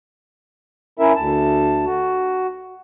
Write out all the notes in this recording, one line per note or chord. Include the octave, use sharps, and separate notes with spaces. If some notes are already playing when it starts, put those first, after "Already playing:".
C#4 E4 A#4 E5
D2 A5
F#4